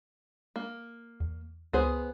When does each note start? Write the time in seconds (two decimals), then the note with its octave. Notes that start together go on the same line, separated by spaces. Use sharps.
0.56 A#3
1.20 E2
1.73 C#2 B3 G#4 C5 F#6